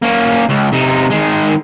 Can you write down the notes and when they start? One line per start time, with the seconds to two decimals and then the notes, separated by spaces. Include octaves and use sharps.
0.03 A#3 C#4
0.49 C#2
0.73 C3 D#4
1.11 D#3 G#3